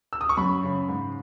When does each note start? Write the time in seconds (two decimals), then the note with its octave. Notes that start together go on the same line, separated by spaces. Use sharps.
0.13 E6
0.21 D#6
0.29 C#6
0.37 F#2 B5
0.63 C#3
0.88 G#2